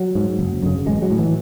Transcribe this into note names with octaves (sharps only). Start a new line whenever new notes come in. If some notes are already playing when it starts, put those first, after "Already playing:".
Already playing: F#3
G#2
F#1
F#2 C#3
A1 G#3
F#3
A2
E3